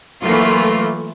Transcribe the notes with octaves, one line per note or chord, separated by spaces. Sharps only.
E3 F#3 A3 A#3 F4